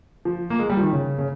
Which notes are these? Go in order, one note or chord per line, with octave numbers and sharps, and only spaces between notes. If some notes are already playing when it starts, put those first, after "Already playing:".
F3
A#3
G#3
G3
F3
D#3
C#3
C#3